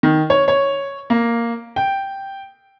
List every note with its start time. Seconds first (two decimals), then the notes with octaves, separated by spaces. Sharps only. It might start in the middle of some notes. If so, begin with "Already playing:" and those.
0.03 D#3
0.30 C#5
0.48 C#5
1.10 A#3
1.76 G5